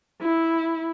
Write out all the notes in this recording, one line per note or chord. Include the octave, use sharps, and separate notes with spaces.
E4